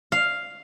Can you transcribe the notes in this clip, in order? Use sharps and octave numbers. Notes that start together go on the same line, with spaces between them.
F5